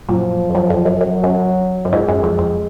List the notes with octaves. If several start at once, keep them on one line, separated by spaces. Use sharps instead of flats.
F#2 A#2 F3
F2
F#2
F2
F#2
F#2 F#3
F#2
F#2
F2 G#2 G#3
F#2
F2
F2